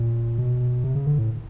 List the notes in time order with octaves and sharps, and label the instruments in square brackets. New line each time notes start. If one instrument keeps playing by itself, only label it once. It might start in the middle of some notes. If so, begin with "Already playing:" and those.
Already playing: [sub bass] A#2
B2
C3
C#3
D3
A2